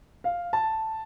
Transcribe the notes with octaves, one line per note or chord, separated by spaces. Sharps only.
F5
A5